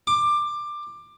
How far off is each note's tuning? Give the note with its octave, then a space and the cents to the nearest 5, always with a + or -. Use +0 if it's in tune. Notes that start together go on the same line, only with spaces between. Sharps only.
D6 +15